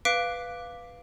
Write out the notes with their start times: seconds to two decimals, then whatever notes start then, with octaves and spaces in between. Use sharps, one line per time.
0.05 B4 F5 D6 F#6 B6 D7